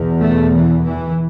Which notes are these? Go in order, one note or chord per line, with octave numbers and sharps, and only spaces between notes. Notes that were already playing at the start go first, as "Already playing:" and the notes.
Already playing: E2 B2
A3
E3
E3